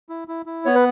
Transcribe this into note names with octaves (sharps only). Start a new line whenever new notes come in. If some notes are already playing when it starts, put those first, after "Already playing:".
E4
E4
E4
B3 C#5
B4